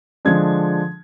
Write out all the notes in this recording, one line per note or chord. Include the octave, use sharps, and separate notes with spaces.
D3 F3 G#3 D4 G#6